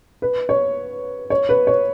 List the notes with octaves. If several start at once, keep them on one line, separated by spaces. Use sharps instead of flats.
B4
C#5
C#5
B4
C#5